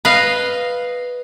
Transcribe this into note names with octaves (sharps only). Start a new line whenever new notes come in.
B4 D#5 F5